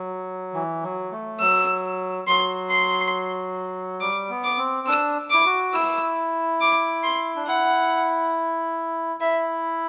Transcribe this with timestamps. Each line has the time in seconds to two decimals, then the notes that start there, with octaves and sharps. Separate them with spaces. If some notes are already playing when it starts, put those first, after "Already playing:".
Already playing: F#3
0.54 E3
0.83 F#3
1.12 A3
1.41 F#3 E6
2.27 F#3 C6
2.70 C6
4.00 G3 D6
4.30 B3
4.44 D6
4.58 C4
4.87 D4 E6
5.30 E4 D6
5.45 F#4
5.74 E4 E6
6.61 D6
7.03 C6
7.36 D4
7.47 E4 F#5
9.20 E4 E5